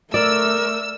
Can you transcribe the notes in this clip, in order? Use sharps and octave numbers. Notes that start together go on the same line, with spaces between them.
A3 A#4 D5 E6